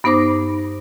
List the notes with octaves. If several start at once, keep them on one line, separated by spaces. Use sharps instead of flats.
G2 B3 D#4 C5 D6 A#6